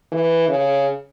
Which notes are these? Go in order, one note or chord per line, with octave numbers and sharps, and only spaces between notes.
E3
C#3